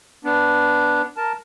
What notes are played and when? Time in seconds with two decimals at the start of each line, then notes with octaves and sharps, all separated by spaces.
0.25 B3 D4
1.17 A#4 A5